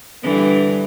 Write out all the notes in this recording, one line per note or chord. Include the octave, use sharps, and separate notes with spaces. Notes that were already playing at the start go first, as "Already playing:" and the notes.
G2 D3 E3